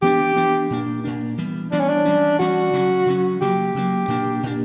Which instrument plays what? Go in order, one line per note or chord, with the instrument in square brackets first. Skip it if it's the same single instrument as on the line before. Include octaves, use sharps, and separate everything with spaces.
[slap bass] E3 B3 D4 [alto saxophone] G4
[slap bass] E3 B3 D4
A#2 A#3 D4
A#2 A#3 D4
E3 G3 B3
[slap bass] E3 G3 B3 [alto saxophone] D4
[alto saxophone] C#4
D4
[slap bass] E3 G3 C#4
[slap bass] E3 G3 C#4 [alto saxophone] F#4
[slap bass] C#3 F#3 C#4
C#3 F#3 C#4
[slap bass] C#3 F#3 A#3 [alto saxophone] G4
[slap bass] C#3 F#3 A#3
A#2 A#3 D4
A#2 A#3 D4